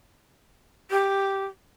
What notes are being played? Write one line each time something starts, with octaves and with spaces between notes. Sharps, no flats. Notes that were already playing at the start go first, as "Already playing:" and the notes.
G4